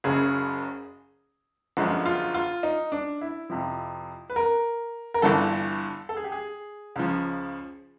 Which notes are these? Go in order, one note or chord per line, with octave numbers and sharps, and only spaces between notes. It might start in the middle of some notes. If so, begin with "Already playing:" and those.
F#1 F#2 C#3 G#4
G1 F#2 D3 F3 G#3
F4
F4
D#4
D4
E4
F2 C3 F3
B4
A#4
A#4
G1 G2 E3 A4
A4
G#4
G4
G#4
C#2 C#3 F3